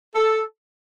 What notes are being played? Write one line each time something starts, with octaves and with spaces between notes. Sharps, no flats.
A4